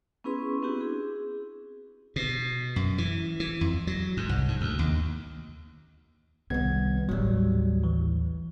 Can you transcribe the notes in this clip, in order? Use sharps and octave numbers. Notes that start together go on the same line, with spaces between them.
B3 C#4 E4 G#4 B4 C6
B3 C4 D4 E4 F#4 G4
G#4
B2
F#2
E3
E3
F2
F#3
G#2
C2
G#2
D2
D#2
C2 D#3 G3 B3 G#6
A1 D#2 F#3 G3
E3